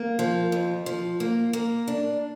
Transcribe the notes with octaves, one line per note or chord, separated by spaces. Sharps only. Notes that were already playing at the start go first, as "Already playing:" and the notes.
Already playing: A#3
F3
F2
F3
A#3
A#3
D4